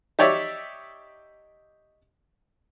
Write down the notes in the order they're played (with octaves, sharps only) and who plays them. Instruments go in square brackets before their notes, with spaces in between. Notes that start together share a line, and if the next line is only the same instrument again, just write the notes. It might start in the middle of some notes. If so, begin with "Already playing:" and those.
[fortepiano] D#4 G4 C#5 D5 E5